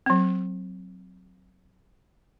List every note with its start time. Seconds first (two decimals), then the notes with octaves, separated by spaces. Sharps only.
0.06 F#3 C4